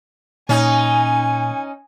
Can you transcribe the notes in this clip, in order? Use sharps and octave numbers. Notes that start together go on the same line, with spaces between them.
A#2 C#4 D#4 G#5